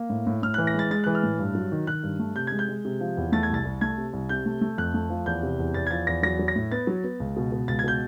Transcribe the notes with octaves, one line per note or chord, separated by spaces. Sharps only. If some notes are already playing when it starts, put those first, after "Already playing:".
Already playing: A#3
A2
A2
A2 F6
E3 F#6
A#6
G#3 A6
G#3 A6
E3 F#6
F6
A2
G2
F#3
D#3
D#3 F#6
G2
A3
C3 G6
G#3 G#6
G6
G#3
C3
F3
E2
A3 A6
G#6
C2 A6
C2
A3 G#6
C3
C2
C3 G6
A3
A3
F2 F#6
A3
F3
E2 G6
C3
E2
E2 A6
G#6
F3 A6
E2 A#6
F#3 A#6
F#3
A#6
A2
B3 A6
F#3
B3
C#2
B2
B2
C#2 A6
G#6
B2 G6